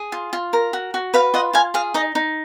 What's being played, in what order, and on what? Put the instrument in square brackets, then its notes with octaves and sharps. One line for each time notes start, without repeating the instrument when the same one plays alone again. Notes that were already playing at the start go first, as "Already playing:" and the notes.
Already playing: [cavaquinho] G#4
F4
F4
A#4
F#4
F#4
B4 F5
F4 D#5 F#5
F4 F5 G#5
G#4 F5
D#4 D#5
D#4